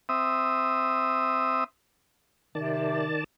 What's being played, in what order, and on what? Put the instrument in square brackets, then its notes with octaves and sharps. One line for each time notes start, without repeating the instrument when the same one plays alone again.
[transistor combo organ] C4 E5 D#6
[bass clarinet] C3 [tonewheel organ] D#3 D5 A5